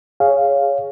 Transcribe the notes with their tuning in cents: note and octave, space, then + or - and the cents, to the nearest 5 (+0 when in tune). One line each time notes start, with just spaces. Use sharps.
G#4 +0 C#5 +10 F5 +0